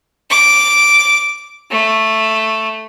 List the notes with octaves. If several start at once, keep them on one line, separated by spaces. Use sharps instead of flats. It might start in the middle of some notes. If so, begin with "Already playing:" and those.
D6
A3